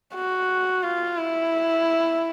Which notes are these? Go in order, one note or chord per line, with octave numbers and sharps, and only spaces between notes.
F#4
F4
E4